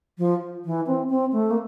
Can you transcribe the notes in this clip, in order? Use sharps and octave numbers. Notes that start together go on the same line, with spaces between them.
F3
E3
C4
C4
A3
A#3